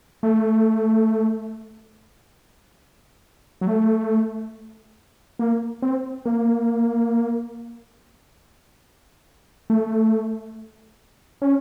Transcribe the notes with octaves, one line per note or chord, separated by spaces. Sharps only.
A3
F#3
A3
A#3
C4
A#3
A3
C#4